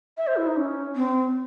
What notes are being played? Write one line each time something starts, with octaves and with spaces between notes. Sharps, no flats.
E5
C5
E4
D#4
C#4
C4